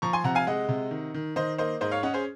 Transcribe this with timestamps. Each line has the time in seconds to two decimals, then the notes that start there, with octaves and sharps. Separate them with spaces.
0.02 F3 A#5 C#6
0.13 G#5 C6
0.24 C3 F#5 A#5
0.35 F5 G#5
0.47 G#3 D#5 F#5
0.69 C3
0.91 D#3
1.14 D#3
1.36 D#3 C5 D#5
1.58 A#3 C5 D#5
1.81 G#2 C5 D#5
1.92 C#5 F5
2.03 C#4 D#5 F#5
2.14 G#4 C5